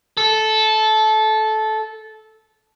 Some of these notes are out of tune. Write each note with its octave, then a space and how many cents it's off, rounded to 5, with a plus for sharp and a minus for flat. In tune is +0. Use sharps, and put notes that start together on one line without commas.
A4 -15